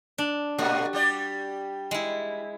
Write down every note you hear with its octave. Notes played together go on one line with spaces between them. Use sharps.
D4
A#2 A3 A#3 F#4
G3 G4 D5
G#3 E4